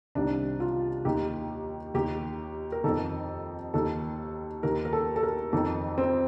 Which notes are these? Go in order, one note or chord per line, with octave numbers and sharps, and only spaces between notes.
C2 C3 D#3 D4
F4
D#2 D#3 G4
D#2 D#3 G4
A#4
F2 D#3 A4
D#2 D#3 A4
D#2 D#3 A#4
A#4
A4
A4
A#4
F2 D#3 A4
C4